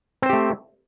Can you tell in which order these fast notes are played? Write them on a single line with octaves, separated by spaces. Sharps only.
C4 C5 G4 A3